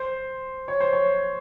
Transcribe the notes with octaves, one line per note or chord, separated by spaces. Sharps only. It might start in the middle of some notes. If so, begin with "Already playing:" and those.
Already playing: C5
C#5
C5
C#5